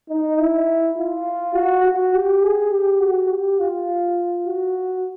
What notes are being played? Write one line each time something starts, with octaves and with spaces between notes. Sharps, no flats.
D#4
E4
F4
F#4
F#4
G4
G#4
G4
F#4
G4
F4
F#4